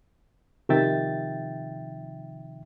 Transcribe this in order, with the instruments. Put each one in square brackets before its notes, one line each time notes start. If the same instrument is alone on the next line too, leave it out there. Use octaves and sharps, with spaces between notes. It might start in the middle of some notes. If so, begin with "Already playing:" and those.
[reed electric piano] C3 D#3 F3 E5 G5 A6